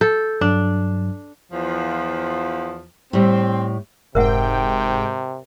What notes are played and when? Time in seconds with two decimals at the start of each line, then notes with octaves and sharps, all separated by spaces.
0.01 A4 G6
0.41 G2 F#3 D4
1.52 E2 F3
3.13 A2 G3 C4
4.15 F1 G#2 C3 A#4 E5 F#5 G5